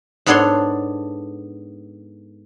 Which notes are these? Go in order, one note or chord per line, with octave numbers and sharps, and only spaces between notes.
G#2 B3 D4 A4 C#5 C6